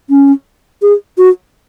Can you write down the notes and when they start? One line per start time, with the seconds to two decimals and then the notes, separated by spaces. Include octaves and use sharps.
0.10 C#4
0.82 G#4
1.18 F#4